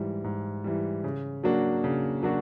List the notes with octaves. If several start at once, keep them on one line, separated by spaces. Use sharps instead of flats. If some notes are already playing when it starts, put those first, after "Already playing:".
Already playing: G#2 E3 G3
G#2
E3 G3
C#3
F#3 A#3 D4 F#4
C#3
F#3 A#3 D4 F#4